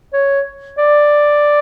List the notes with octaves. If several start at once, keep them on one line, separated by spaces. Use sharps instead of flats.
C#5
D5